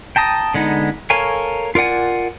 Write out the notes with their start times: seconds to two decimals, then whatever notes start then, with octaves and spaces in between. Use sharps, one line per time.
0.16 G5 A5 A#5 D#6
0.54 D3 G#3 B3 D#4
1.10 A4 A#4 C#5 F5 G#5
1.75 F4 A#4 D5 F#5 G#5